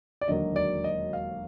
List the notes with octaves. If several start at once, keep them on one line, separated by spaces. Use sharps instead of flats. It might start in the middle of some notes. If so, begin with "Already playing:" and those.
D5
E1 D#2 D3 F#3 A#3 D#5
D5
D#5
F5